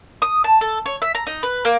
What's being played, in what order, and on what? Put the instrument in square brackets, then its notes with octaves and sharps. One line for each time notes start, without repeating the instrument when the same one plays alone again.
[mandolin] D#6
A5
A4
C#5
E5
A#5
D#4
B4
A#3